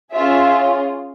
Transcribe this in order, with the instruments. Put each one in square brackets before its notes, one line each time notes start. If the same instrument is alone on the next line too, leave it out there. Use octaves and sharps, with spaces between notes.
[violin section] C#4 F4 G#4 E5